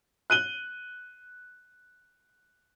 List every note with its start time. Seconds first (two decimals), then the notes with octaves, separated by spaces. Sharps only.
0.30 F#6 D#7 G7